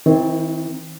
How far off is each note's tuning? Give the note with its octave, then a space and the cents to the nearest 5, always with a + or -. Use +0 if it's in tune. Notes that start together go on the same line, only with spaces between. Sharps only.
D#3 +35 C4 +0 E4 +0